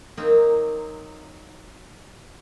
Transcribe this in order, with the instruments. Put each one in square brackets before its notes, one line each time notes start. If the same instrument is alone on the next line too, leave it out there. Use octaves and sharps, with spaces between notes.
[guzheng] F#3 A#3 C4 D#4